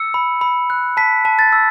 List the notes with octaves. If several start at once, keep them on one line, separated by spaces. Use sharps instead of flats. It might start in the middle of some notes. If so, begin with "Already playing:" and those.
Already playing: E6 C#7
B5
B5
F#6
A5 B6
A5
A6
E6